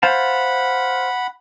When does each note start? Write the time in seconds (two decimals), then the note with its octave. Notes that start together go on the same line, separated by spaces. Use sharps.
0.03 C5 F5 F#5 A5 B5